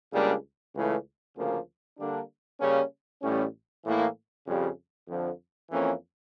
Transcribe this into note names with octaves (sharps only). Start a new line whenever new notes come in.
C#2 C#3 G3 A#3 D4
C#2 C#3 E3 A3
D2 C#3 F3 A#3
D3 G3 A#3 D4
C#3 G3 A#3 C#4
A1 A2 G3 C#4
A2 E3 A#3 E4
F2 C#3 G3
F2 D3 F3
F2 E3 A#3 C#4